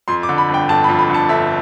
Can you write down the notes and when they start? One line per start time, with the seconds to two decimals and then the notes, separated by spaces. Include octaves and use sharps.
0.08 F2 C6
0.23 D6
0.29 D3
0.38 B5
0.49 G1
0.54 G5
0.69 G1 A5
0.84 B5
0.89 F2
0.99 B5
1.10 D3 A5
1.29 G1 E5